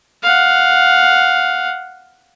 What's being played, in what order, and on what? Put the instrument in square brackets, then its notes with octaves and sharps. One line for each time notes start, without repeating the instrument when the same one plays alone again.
[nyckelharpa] F5 F#5